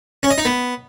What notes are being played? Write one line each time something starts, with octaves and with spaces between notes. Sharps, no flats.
C#4
D#5
D#4
B3